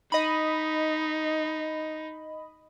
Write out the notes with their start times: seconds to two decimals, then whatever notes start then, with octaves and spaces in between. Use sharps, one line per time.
0.12 D#4 D#5 B5